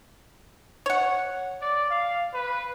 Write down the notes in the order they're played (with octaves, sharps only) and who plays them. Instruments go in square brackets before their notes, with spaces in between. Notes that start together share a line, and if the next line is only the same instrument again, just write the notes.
[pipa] C#5 F#5
[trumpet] D5
F5
B4